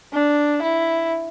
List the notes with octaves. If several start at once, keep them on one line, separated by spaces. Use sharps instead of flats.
D4
E4